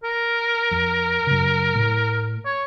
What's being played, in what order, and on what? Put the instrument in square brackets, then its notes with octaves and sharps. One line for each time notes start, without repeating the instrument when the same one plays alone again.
[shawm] A#4
[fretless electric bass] F2
F#2 C#3
A2
[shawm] C#5